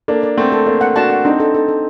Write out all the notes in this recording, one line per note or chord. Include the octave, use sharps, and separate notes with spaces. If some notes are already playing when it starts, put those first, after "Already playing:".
A#3 D4 A4
D5
A3 C4 F#5
A4
A#3 D4 A4
F#5
D4 F#4 A5
F#5
C4 D4 D#4
A4
A4
A4